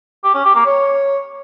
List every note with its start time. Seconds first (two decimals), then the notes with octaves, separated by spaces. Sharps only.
0.24 G4
0.35 C#4
0.45 G4
0.55 A#3
0.66 C#5